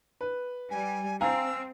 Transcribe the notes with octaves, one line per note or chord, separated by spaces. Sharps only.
B4
G3 G#5
C4 F5 G#5 A#5 E6